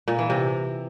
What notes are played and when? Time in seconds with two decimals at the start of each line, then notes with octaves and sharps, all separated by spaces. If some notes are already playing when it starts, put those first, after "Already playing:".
0.08 A#2
0.19 E3
0.30 C3